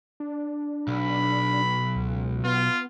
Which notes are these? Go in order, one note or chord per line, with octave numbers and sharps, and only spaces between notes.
D4
B1 B5
C#2
B3 F4